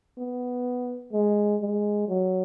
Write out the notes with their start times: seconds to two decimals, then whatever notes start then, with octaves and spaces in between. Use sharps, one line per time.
0.18 B3
1.13 G#3
1.61 G#3
2.09 F#3